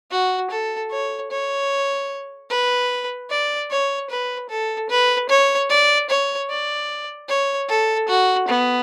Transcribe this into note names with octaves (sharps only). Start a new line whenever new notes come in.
F#4
A4
C#5
C#5
B4
D5
C#5
B4
A4
B4
C#5
D5
C#5
D5
C#5
A4
F#4
B3